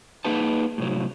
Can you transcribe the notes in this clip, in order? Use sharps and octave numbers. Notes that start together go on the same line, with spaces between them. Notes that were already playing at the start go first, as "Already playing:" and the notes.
A#3 D#4 G#4 B4 F#5 A5
A2 C3 F#3